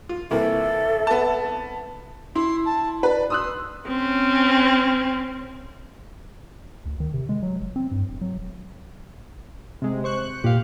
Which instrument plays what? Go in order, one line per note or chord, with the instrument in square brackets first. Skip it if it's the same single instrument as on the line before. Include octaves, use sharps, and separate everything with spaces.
[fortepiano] F4
[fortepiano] C2 E3 A#3 [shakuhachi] A4 [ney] E5
[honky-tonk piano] B3 A5
[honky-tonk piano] E4 [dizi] C6
[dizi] A5
[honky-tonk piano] B4 [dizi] D5
[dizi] C6 [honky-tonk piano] D#6 E6 F#6
[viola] C4 C#4
[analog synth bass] D2
D#3
C3
G#3
F#3
F1
C4
G2
D#1
F#3
D#1
[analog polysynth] C3 G#3
C5 C#6 F#6
[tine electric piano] A#2 [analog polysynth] G4 F5